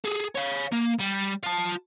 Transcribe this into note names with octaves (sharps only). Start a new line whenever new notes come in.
G#4 A4
C#5 F5
A#3
G3
F4 A5